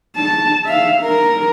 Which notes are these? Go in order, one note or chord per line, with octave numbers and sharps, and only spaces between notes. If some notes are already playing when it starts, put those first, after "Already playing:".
A5
E5 F5
A#4